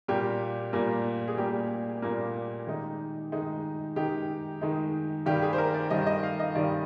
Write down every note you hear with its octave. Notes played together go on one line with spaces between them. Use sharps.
A#2 G3 A#3 G4
A#2 G3 A#3
G#4
A#2 G3 A#3 G4
A#2 G3 A#3
D#3 G#3 D#4
D#3 G#3 D#4
D#3 G#3 D#4 G4
D#3 G#3 D#4
G2 D#3 G3 G4
G#4
C5
A#4
D5
G2 D#3 G3 D#5
D#5
F5
D#5
G2 D#3 G3 D5